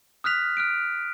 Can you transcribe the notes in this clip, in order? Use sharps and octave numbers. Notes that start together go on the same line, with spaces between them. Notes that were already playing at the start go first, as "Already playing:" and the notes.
D#6 F6 F#6 B6 F7
F6 F#6 D7